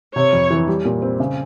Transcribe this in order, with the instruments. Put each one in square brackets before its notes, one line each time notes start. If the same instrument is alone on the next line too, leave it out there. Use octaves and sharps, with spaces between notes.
[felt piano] C3 [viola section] C#5
[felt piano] F2
E3
G3
A#2
C4
C#3